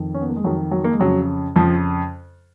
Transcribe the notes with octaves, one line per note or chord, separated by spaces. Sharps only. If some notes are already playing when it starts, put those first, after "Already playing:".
Already playing: F2 D#3
C#4
B3
A#3
G#3
F2 D#3 F#3
F#3
A#3
G#3
F2 C#3 F#3
F2 C#3 F3